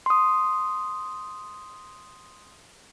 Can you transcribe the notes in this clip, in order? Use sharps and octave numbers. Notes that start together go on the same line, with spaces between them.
C6 D#6